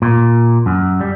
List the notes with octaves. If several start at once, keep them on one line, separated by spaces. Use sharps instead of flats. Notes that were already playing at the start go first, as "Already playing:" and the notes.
A#2
F#2
G3